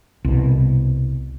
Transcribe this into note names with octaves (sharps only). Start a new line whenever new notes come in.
C2 B2